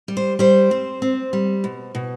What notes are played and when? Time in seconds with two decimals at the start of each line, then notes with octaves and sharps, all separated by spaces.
0.08 G3
0.17 C5
0.39 G3 C5
0.71 C4
1.02 C4
1.33 G3
1.64 B2
1.95 B2